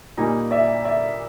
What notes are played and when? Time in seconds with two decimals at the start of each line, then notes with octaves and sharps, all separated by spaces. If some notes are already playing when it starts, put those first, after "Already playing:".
0.17 A#2 G3 A#3 D#4 G#5 A#5
0.51 D5 E5
0.85 D5 E5